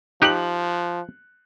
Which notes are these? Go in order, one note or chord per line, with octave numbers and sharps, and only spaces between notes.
F3 D#4 G4 F#6 F#7